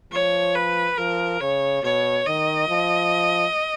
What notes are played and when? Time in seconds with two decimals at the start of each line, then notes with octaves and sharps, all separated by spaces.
0.12 F3 C#5
0.55 B4
0.98 F3 A#4
1.41 C#3 C#5
1.83 B2 C#5
2.26 D#3 D#5
2.68 F3